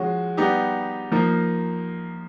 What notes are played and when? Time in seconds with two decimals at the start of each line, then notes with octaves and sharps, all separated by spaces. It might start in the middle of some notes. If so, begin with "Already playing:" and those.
Already playing: F3 G#3 C#4 F#4
0.37 G3 B3 D#4 G4
1.12 F3 A#3 D#4